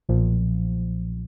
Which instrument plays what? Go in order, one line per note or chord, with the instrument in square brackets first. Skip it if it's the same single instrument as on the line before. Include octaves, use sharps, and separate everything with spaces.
[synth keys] B1 A#2 F3